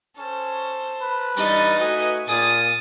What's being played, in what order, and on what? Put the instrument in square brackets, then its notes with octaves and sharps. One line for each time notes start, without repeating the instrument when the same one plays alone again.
[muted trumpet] C#4 [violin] A4 C5
[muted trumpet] B4
[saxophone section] G2 E3 G3 [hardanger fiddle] D#4 [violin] C#6 A6
[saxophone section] A3 F#4 B4 [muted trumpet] D#5 [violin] G#5
[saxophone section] A#2 [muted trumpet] G#4 [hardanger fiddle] D#6 [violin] A6